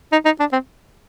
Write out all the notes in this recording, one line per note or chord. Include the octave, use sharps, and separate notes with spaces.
D#4
D#4
D4
C4